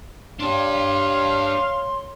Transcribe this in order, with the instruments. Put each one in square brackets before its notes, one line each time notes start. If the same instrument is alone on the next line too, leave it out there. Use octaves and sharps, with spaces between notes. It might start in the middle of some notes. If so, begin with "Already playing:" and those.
[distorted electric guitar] D4 G4 [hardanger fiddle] C#5 [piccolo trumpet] F5 [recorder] C6